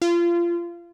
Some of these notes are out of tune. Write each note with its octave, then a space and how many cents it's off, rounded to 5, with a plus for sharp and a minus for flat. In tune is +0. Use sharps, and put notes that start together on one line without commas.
F4 -25